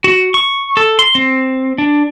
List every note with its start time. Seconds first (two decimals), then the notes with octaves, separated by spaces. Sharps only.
0.04 F#4
0.34 C#6
0.77 A4
0.99 C6
1.15 C4
1.78 D4